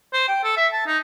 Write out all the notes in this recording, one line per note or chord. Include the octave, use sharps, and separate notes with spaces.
C5
G5
A4
E5
A5
D#4